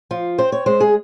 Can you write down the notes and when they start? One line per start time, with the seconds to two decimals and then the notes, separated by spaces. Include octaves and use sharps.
0.11 F3 F4
0.38 C4 C5
0.52 C#5
0.66 G#3 C5
0.80 G#4